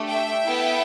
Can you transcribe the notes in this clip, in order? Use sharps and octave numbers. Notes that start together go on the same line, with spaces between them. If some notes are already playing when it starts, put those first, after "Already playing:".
Already playing: A3 D4 G4
E5 G5
B3 E4 A4